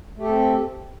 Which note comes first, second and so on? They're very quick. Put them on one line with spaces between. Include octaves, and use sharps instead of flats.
A3 G4 A4 C4